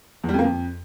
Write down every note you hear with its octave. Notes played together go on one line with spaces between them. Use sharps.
E2
G3
F2
A#3
F2